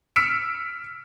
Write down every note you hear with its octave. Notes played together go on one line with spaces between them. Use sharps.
E6 F6 B6 C#7 D7 E7